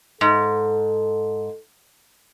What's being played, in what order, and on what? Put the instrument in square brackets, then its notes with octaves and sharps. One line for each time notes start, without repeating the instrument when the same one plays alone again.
[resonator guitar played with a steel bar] G#2 [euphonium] A4